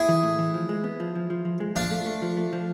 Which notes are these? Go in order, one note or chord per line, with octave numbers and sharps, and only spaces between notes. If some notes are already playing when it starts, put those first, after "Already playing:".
Already playing: E4 G#4
E3
A2
E3
F3
G#3
B3
F3
F3
F3
F3
G#3
F3 D4 F4
A3
A3
F3
A3
F3